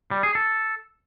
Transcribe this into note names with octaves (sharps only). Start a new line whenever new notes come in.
G3
G#4
A4